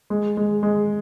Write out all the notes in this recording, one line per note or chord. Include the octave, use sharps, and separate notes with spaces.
G#3
G#3
G#3